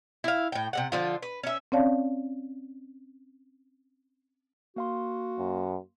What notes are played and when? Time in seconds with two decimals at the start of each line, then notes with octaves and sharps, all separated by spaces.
0.24 E4 F5
0.52 A2 G5
0.73 C3 G3 F#5
0.92 D3 F3 F4
1.22 B4
1.43 C#4 E5
1.72 C4 C#4 C#5 D5 F5 A5
4.76 A#3 F#4 F5 C6
5.38 F#2